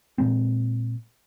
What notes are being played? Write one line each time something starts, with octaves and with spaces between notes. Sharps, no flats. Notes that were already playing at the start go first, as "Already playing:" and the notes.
A#2 G#3 C4